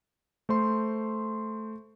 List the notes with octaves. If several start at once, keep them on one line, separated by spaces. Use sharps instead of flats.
A3 C5 C6